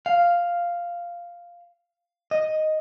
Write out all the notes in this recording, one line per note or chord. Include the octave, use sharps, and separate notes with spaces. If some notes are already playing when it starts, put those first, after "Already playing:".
F5
D#5